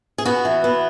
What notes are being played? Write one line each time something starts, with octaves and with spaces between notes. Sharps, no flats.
G#4
B3 F#4
E3
B3